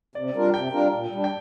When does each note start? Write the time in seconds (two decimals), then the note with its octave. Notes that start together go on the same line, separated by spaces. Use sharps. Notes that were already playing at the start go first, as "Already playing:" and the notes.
0.15 C3 D5
0.34 G3 D4 F4 A#4
0.54 C3 G5
0.72 G3 D4 F4 A#4
0.91 A#2
1.10 G3 D4
1.24 G5